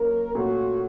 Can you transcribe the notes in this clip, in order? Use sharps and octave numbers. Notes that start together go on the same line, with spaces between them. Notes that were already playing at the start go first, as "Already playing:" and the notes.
Already playing: F#3 A#3 C#4 A#4
A#2 A3 C#4 F#4